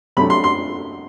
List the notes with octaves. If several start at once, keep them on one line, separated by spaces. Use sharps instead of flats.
C3 F#3 A3 D4 B5
C6
C6